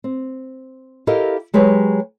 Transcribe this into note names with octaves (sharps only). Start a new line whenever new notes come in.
C4
E4 G4 A4 A#4 D#5 F5
F#3 G#3 G4 B4 C#5